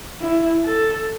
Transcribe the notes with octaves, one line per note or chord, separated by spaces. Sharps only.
E4
A4